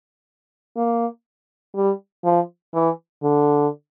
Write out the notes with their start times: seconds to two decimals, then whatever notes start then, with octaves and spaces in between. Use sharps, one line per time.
0.77 A#3
1.76 G3
2.25 F3
2.74 E3
3.23 D3